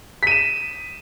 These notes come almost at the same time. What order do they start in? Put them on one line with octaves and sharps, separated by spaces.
B6 D#7 E7